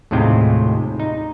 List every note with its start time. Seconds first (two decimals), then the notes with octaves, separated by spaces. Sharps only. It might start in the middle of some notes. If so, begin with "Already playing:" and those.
0.11 D#2 A2 C3 G#3 F4 G5
1.00 D#4